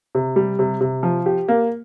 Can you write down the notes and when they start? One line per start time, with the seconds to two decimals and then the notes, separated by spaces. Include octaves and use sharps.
0.15 C3
0.36 G3
0.59 C3
0.81 C3
1.03 F3
1.26 G4
1.48 A#3